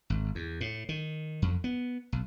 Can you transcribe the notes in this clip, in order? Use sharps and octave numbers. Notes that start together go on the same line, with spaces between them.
G#1
E2
A2
D#3
F2
B3
B1